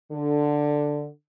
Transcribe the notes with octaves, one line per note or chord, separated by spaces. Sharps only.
D3